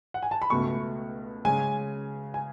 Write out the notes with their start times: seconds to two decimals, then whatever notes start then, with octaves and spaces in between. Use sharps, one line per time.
0.14 F#5
0.23 G#5
0.31 A5
0.42 B5
0.50 C#2 B2 A3 C#6
1.45 C#3 G#3 C#4 G#5
2.34 G#5